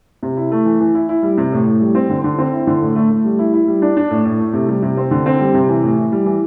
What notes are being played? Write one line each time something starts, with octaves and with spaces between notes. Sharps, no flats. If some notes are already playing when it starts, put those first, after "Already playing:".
C3
E4
A3
E3
E3
E4
E4
G3
C3
A2
A2
G3
C4
D3
D3
C4
E4
D3
A2
A3
A3
G3
E4
E4
G3
D4
D4
A2
A2
A3
C3
G3
C3
C4
D3
C4
G3
C3
E3
A2
E4
G3
E3